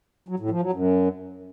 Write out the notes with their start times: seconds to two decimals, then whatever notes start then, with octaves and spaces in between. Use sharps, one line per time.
0.28 F#3
0.39 A2
0.50 F3
0.61 F#3
0.72 F#2